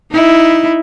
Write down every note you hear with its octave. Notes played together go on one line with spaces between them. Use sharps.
D#4 E4